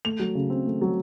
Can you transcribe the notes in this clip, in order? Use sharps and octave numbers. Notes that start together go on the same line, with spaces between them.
A3 F7
F#3
C#3
C4
A3
F#3